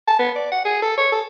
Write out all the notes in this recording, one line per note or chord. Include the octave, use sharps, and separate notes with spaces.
A5
B3
D5
F#5
G#4
A4
C#5
A4